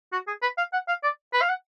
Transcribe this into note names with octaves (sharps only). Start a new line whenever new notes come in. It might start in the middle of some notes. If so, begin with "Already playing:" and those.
F#4
G#4
B4
F5
F#5
F5
D5
B4
F5
F#5